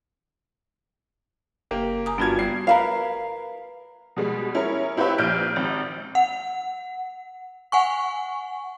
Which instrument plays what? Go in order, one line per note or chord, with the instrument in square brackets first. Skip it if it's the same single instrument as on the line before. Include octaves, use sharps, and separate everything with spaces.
[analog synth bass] F#1 [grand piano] A#3 G4
[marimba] G#5 A#5 D#6
[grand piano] G2 G#6 [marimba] B3 F4 F#4
[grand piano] G3 C7
[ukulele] A#4 B4 F5
[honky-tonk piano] B2 G3 G#3
C#4 E4 A#4
C4 E4 G4 B4 C#5 E5
A#1 F6 G6 D7
G#1
[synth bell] F#5
F#5 G#5 C#6